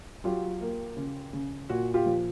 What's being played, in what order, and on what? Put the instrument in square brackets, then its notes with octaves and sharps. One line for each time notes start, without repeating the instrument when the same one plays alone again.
[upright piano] F#3 F4 G4
A#3
C#3
C#3
A#2 F#4
F4 G4
F3